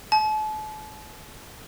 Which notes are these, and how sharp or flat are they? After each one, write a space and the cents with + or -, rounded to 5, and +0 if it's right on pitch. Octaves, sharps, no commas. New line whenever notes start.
A5 -40